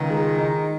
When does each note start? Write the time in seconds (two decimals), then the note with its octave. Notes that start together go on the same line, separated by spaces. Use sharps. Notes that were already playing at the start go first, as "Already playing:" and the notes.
Already playing: C#2 D#3
0.10 G#3
0.38 D#4